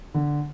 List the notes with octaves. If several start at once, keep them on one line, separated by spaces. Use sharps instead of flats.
D3